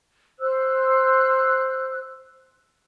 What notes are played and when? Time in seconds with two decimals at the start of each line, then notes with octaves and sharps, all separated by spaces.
0.40 C5 E6 F#6